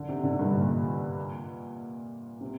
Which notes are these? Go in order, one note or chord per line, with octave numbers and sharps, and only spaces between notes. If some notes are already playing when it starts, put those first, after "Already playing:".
Already playing: D3
C3
D3
G2
A#2
C3